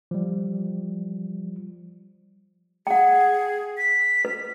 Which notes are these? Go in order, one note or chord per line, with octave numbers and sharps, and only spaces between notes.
F3 G3
G#4 F#5 G5
B6
B4